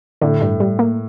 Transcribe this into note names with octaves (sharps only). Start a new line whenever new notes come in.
A2 D3
G2
G3
A#3